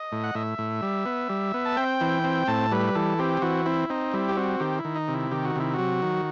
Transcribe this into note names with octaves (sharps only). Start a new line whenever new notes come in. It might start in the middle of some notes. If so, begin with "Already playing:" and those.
Already playing: D#5
A2
F#5
A2 E5
A2
G3
B3
G3
B3
A5
C4 G5
E3
C4
A2 A5
G3 B4
E3 A4
C4 G4
E3 F#4
C4 E4
C4 D#4
G3 E4
G4
C4 F#4
D#3 G4
E4
D#3
D#4
C3
E4
D#3 G4
F#4
C3 E4
F#3 F#4
D#3